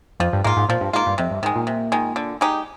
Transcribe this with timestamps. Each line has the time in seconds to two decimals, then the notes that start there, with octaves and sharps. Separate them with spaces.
0.20 F2 F3
0.33 G2
0.44 G#2 A#3 F4
0.56 G#2
0.69 A#2 F3
0.81 G2
0.93 G#2 A#3 F4
1.06 G2
1.18 F2 C3
1.31 G2
1.42 G#2 D#3 G#3
1.56 A#2
1.67 C3
1.92 D#3 G#3
2.16 D3
2.41 G#3 D#4 G4